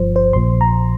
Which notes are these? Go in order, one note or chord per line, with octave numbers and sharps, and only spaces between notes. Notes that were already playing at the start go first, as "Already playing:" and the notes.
Already playing: G1 G2 F3 C5
C5
A#1 A#2 F3 C6
A#5